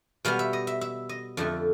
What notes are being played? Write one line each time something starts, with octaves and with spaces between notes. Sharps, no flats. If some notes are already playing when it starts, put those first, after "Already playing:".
B2 G3 B3 F5
E5
D#5
E5
E5
D#5
F2 D3 F3 A3